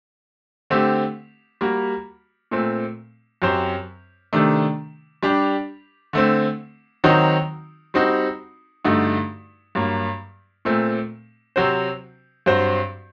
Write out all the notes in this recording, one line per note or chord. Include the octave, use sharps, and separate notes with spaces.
D3 A3 C4 G4
G3 A#3 F#4
A#2 A3 C4
F#2 F#3 C4 G4 C5
C3 D#3 A3 D4
G3 D4 G4
D3 A3 C4
D#3 F#3 C4 D#4 F#4
G3 C4 D#4 F#4
G2 D3 A3 D#4 F#4
G2 F#3 A#3
A#2 A3 C4
C3 F#3 C4 F#4 C5
G2 F#3 C4 F#4 C5